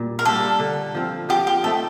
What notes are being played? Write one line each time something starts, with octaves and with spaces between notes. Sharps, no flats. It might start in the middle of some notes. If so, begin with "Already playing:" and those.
Already playing: A#2 G3
A#4
G3 A#3 D4 A4
D3
F3 C4 F4
F3 G4
G4
A3 C4 D#4 A4